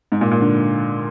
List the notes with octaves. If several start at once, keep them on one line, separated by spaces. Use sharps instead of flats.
G#2
A#2
A#2
D3